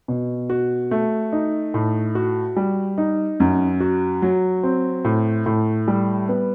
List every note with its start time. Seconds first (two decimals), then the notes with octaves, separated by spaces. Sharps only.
0.08 B2
0.50 F#4
0.91 A3
1.32 D#4
1.74 A2
2.15 F#4
2.56 G3
2.98 D#4
3.40 F#2
3.80 F#4
4.22 F#3
4.63 C4
5.05 A2
5.46 A2
5.88 G3
6.29 B3